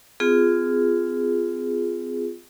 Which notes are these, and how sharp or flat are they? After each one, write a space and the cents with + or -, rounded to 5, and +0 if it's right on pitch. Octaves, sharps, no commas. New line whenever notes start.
C4 -40 F4 +0 G#4 +0